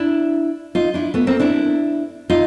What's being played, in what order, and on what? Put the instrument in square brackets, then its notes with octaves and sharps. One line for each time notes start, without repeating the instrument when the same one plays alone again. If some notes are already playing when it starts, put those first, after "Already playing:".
Already playing: [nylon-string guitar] D4 E4
D#4 F4
D4 E4
A3 B3
A#3 C4
D4 E4
D#4 F4